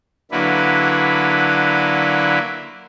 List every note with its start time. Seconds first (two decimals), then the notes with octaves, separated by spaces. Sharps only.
0.32 D3 F#3 A#3 D4 E4 B4